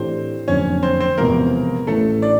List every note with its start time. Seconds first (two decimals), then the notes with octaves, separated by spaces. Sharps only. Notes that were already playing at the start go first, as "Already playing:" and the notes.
Already playing: A2 E3 A3 C4 D4 G4 C5
0.48 F#1 F2 D3 C#4 C#5
0.83 C4 C5
1.00 C4 C5
1.17 E1 E2 C3 F3 A#3 A#4
1.87 A1 A2 E3 A3 A4
2.22 D4 D5